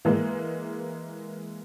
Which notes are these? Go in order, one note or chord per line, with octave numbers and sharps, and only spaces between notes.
E3 G#3 A#3